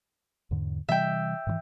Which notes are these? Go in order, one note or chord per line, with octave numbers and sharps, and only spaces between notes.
E2 G#2 D3
C3 E3 G3 E5 G5
G#2 D3 E3